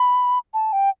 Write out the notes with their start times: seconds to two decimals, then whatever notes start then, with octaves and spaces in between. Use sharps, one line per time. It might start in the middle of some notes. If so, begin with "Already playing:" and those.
Already playing: B5
0.54 A5
0.73 G5